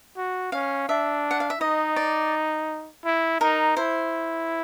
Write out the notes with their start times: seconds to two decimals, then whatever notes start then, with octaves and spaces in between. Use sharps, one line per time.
0.17 F#4
0.52 C#4 F5
0.89 D4 E5
1.31 F#5
1.40 F5
1.50 E5
1.61 D#4 D#5
1.96 D5
3.05 E4
3.41 D#4 A#4
3.77 E4 C5